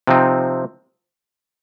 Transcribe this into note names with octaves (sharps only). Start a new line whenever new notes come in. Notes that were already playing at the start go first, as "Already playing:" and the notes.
C3 F3 C4 D#4